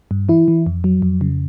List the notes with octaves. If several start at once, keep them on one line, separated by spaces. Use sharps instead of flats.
G2
E3 E4
E3
F2
F#3
F2
C#3